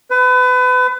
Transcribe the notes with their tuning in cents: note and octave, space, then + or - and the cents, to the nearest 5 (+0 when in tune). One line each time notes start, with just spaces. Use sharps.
B4 +30